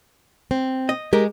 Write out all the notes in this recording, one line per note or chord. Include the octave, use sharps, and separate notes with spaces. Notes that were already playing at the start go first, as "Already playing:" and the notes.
C4
D#5
G#3 G4 A#4